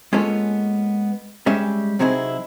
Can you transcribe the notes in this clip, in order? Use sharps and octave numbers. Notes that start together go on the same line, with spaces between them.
G#3 A#3 B3 C#4 F4 A4
G3 G#3 C#4 C#5 E5
C3 F#3 C4 D#4 E4 G#4